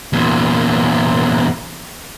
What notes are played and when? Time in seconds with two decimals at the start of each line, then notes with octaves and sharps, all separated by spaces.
0.13 E2 A#2